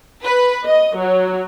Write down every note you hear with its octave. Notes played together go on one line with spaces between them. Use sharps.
B4
D#5
F#3